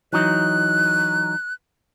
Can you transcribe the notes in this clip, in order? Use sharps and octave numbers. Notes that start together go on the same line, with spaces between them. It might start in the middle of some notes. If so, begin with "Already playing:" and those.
E3 F#3 D#4 F#6